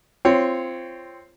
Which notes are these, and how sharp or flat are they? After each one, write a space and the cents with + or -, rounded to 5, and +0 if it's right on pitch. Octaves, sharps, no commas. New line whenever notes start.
C4 +0 F4 -20 C#5 +0